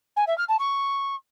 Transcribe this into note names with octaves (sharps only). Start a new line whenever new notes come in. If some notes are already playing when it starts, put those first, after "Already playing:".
G#5
E5
F6
A5
C#6